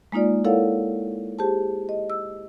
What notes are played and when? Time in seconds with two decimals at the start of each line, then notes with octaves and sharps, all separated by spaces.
0.12 G#3 A#3 D#4 F4 D5
0.44 E4 A4 A#4 C#5 F5 F#5
1.39 G4 G#4 C5 A5
1.89 D#5
2.10 E6